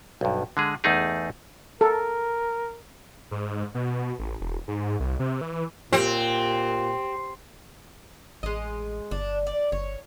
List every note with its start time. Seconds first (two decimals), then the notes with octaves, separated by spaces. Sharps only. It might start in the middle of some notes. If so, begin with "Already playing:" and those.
0.21 B1 G2
0.57 D3 G#3 G#4
0.84 E2 A3 D#4 G#4
1.81 A4 A#4
3.31 G#2
3.75 B2
4.19 A1
4.41 E1
4.68 G#2
5.00 C2
5.19 C3
5.41 E3
5.93 A#2 C4 G4
8.43 A1 G#3 D#5
9.11 G1 D4
9.47 D5
9.72 G1 C#5